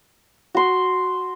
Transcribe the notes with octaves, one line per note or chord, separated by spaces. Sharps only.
F#4 C6